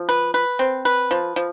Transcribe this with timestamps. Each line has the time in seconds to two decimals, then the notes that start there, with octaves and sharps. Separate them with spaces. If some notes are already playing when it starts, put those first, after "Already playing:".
Already playing: F3
0.09 B4
0.34 B4
0.59 C4
0.85 B4
1.11 F3
1.36 F3